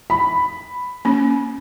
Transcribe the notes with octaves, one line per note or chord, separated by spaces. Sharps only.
B5
A#3 C#4